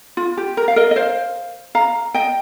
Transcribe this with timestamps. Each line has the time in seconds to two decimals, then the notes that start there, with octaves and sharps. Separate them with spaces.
0.17 F4
0.37 G4
0.57 A#4
0.68 F5
0.76 A#4 D#5
0.91 D#5
0.96 C5 F5
1.75 F5 A#5
2.14 D#5 G5